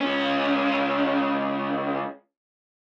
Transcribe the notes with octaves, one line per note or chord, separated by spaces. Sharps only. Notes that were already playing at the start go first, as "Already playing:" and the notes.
C#2 C#4